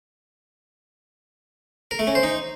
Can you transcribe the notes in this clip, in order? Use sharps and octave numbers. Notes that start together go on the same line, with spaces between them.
A#4
A3
C#4
C5
D#4